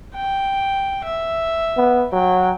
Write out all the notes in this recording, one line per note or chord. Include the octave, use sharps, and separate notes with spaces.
G5
E5
B3
F#3 G5